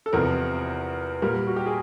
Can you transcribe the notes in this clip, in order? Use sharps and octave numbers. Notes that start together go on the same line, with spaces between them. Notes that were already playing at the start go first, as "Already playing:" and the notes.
A4
E2 C3 F3 A#4
A#2 G3 A#4
F#4
G4
G#4